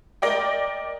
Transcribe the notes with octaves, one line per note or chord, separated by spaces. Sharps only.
A#4 D5 D#5 G5